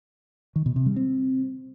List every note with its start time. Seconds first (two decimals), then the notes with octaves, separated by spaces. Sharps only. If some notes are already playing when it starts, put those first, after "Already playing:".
0.56 D#3
0.66 B2
0.76 C3
0.86 G3
0.96 C4